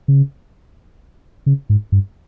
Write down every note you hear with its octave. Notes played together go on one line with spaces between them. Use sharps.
C#3
C#3
G#2
G2